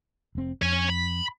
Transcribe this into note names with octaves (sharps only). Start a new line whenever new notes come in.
F1 C4
F2 C#5 G#5
B5